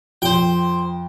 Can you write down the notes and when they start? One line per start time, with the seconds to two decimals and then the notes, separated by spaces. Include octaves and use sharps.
0.22 F2 C5 G5